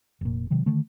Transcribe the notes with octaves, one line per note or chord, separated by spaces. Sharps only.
F1 A#2
C3 D#3 F#3 G#3
D3 D#3 A3